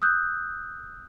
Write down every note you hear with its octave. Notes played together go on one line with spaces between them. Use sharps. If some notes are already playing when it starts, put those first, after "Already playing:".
D#6 E6 F#6 G6